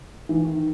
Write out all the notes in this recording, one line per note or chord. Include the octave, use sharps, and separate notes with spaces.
E3
D#3